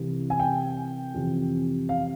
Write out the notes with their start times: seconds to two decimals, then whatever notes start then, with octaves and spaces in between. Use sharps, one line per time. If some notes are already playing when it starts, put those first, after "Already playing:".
Already playing: C2 C3 E3
0.30 G#5
0.40 G5
1.14 F2 C3 E3
1.89 F5